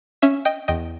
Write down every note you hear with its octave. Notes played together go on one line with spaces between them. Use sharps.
C#4 E5
D#5 G5
E2 D#5 G5